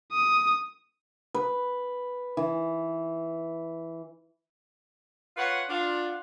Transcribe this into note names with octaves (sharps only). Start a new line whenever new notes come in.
D#6
B4
E3
F4 B4 C#5 F#5
D4 F4 F#5